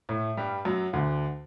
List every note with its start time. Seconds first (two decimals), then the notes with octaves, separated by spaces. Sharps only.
0.09 A2 A3
0.37 G2 G3
0.65 F#2 F#3
0.93 D2 D3